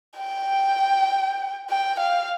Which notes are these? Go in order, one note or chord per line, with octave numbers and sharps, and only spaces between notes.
G5
G5
F5